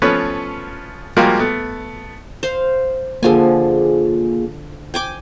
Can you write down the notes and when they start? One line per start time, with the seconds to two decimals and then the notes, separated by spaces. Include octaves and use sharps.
0.02 F3 A3 B3 C#4 B4 C#5
1.17 F3 G3 G#3 A#3 F4 F#4
1.39 A3 B3
2.43 C5 F5
3.23 D3 F3 A#3 F4 G#4 G#5
4.94 G5 G#5 D6